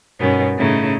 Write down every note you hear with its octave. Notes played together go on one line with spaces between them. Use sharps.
G2 B2 D#3 B3 C#4
A2 C#3 A3 D#4 E4